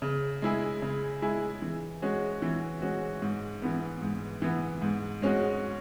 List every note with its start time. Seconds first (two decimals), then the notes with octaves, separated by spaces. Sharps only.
0.02 C#3
0.42 G#3 E4 G#4
0.82 C#3
1.22 G#3 E4 G#4
1.62 E3
2.02 G#3 C#4 F#4
2.42 E3
2.82 G#3 C#4 F#4
3.22 G#2
3.62 E3 B3
4.02 G#2
4.42 E3 B3
4.82 G#2
5.22 G#3 C#4 F#4